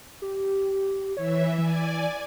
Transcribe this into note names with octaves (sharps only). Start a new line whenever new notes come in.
G4
E3 C#5 E5
E3 D5 G#5